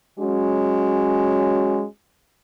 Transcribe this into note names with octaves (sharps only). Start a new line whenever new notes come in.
F#3 G#3 C#4 F#4